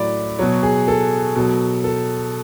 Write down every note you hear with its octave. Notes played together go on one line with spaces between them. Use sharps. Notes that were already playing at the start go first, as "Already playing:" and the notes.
Already playing: A2 F#3 D5 B5
B2 F#3 C#5
G#4
A4
B2 F#3
A4